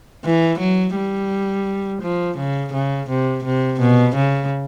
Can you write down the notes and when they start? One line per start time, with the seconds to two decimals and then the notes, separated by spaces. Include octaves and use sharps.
0.25 E3
0.60 F#3
0.96 G3
2.02 F3
2.38 C#3
2.74 C#3
3.10 C3
3.44 C3
3.81 B2
4.16 C#3